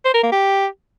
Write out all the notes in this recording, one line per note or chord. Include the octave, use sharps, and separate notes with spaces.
C5
A#4
A#3
G4